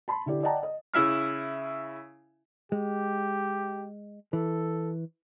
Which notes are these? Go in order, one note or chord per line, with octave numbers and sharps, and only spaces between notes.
A5 B5 C6
D3 E4 G4 D5
D5 D#5 F#5 G5 A5 A#5
D#5
C#3 E4 E5 F6
G#3 G4
E3 A4